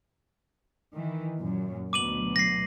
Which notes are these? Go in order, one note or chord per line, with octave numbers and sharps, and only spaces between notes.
D#3 E3
F#2 A#2
D2 B2 F#3 D6 D#7 F#7
A#6 C7